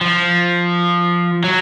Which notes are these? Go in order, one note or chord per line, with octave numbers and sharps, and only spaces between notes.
F3
F#3